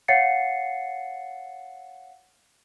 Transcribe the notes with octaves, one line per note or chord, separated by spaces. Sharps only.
C#5 F5 F#5 A6 C7 C#7